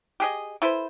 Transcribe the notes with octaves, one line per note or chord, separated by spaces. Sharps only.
G4 G#4 D#5
E4 A4 B4 C5